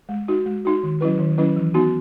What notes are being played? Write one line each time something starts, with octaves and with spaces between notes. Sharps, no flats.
G#3
D#4 F#4
G#3
D#4 F#4
D#3
F#3 C#4 E4 B4
D#3
F#3 C#4 E4 B4
E3
B3 D#4 F#4